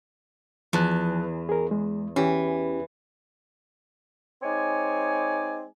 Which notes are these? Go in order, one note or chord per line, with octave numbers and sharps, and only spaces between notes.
E2 F3 A5 F#6
G#4 A#4
G#3
E3 C#4 E4 G4
G#3 C4 D#4 C#5 D5 G#5